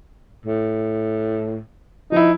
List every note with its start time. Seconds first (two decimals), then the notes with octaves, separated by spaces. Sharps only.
0.46 A2
2.12 F3 D#4 E4